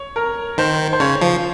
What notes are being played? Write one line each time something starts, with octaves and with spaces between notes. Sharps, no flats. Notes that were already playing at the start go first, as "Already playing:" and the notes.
Already playing: C#5
A#4
D#3 C5
C5
C#3 C#5
F3 C5